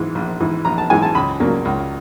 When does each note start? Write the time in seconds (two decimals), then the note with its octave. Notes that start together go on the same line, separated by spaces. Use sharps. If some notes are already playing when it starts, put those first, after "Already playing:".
Already playing: G#2 E3 G#3
0.15 A#1
0.40 G#2 E3 G#3
0.65 A#1 A#5
0.78 A5
0.90 G#2 E3 G#3 G#5
1.02 A5
1.15 C#2 B5
1.40 C#3 F#3 A#3 D4
1.65 C#2